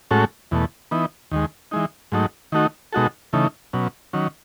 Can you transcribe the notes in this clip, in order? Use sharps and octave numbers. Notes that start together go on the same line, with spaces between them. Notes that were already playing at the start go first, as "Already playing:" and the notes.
A2 G#3 C#4 F#4 A4
E2 B2 A3
E3 B3 D#4
D#2 D#3 G#3
E3 G#3 D#4
G#2 F#3 A3 D#4
D#3 A3 D#4 F#4
B2 G#3 D#4 F#4 A4
C#3 E3 A3 D#4
B2 F#3 C#4
D#3 F#3 C#4